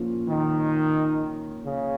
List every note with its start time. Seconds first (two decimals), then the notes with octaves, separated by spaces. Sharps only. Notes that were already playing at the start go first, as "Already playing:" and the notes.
Already playing: A#2 F3 A#3 C#4 F4
0.27 D#3
1.65 C#3